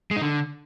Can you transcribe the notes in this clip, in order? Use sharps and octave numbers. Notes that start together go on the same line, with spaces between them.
G#3
D#4
D3